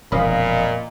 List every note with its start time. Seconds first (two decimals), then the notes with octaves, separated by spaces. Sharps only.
0.12 E1 F2 A#2 F3 D#5 F5 B5